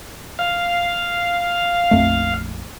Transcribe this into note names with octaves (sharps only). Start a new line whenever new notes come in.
F5
A#1 F2 A3